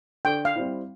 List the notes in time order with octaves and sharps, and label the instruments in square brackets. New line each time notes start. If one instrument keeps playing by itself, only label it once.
[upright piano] D3 [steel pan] G5
[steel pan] F5
[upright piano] G3 C4 E4